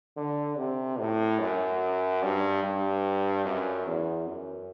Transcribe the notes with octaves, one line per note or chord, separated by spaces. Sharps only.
D3
C3
A2
F#2
G2
G2
F#2
E2
F#2